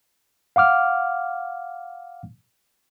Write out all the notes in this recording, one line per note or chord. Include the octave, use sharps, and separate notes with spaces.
F5 F#5 D6 F6